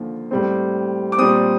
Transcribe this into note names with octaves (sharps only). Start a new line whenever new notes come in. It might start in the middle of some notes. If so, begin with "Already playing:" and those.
Already playing: D#2 D3 F3 A#3
A2 G3 C4
D6
A#2 G3 C4 D#6